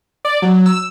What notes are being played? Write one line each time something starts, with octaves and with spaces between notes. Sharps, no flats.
D5
F#3
E6